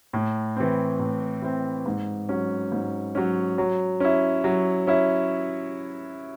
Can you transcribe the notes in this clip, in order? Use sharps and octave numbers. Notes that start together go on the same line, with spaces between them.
A2
E3 C4
A2
E3 C4
G#2
F#3 C#4
G#2
F#3 C#4
F#3
C#4 E4
F#3
C#4 E4